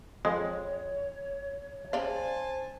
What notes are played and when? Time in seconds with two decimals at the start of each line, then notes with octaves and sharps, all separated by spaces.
0.25 F2 G#3 C#5
1.93 C#3 C5 D5 F5 G#5 A5